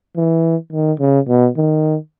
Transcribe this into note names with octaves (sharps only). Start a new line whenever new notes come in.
E3
D#3
C#3
B2
D#3